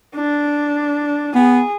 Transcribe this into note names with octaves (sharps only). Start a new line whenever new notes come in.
D4
B3 G#4